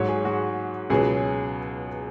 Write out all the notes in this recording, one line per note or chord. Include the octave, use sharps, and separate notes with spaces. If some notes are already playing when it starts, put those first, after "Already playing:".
Already playing: G#2 F#3 C#5
G#4
F#4
C#2 B2 F#3 G#4